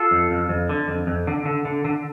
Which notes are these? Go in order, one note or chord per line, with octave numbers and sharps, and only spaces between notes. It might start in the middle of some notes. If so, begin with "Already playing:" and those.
Already playing: F4 A4
F2
F2
F2
D3
F2
F2
D3
D3
D3
D3